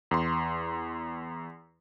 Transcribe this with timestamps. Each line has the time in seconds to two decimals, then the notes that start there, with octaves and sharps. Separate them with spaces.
0.11 E2 C6